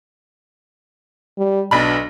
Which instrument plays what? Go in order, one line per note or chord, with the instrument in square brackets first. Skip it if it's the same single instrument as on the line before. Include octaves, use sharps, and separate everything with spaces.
[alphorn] G3
[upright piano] B1 D4 B5 [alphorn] B2